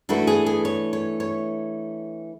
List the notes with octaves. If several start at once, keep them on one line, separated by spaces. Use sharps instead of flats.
E3 A3 D4 F#4
G#4
G#4
C#5
C#5
C#5